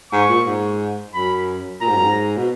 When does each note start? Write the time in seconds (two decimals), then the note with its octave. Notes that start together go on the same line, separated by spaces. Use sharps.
0.12 G#2 C#6
0.29 A#2
0.46 G#2
1.13 F#2 B5
1.81 A#2 A#5
1.88 G#2
1.95 F#2
2.03 G#2
2.37 B2